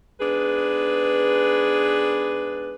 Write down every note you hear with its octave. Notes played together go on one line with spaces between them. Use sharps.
G#2 B3 D4 G#4 B4